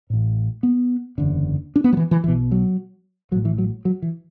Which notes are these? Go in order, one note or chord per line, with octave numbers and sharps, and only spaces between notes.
A1 A2
B3
F#1 E2 D3
D4
B3
F#3
E3
E3
B1 B2 E3
F#3
A1 A2 F#3
E3
F#3
F#3
E3